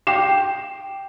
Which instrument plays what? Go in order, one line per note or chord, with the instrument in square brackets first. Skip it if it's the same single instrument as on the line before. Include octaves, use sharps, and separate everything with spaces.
[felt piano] G5 D6 C7 E7